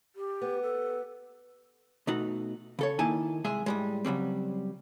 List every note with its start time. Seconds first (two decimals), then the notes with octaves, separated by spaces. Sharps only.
0.16 G4
0.41 B3
0.63 A4
2.07 B2 A3 D#4 F#4
2.79 C#3 A4 C#5
2.99 D#3 A#3 D#4 E4 G#5 A5
3.44 C2 G#3 G#4 E5
3.66 A2 G3 G#3
4.05 C#3 F#3 G3 C4